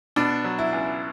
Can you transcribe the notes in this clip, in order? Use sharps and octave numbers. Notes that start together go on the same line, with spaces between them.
B2 D4
F#3
E4
C#2